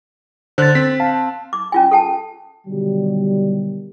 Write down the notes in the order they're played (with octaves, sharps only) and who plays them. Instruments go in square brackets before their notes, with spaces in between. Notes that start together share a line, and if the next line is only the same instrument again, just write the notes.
[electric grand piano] D3 F#6 [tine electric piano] C5 A6
[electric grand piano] C4 [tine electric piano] B6
[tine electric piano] F5 A5
[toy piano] D6
C#4 F4 G#5
A4 G5 A5
[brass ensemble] B2 D3 D#3 F#3 G3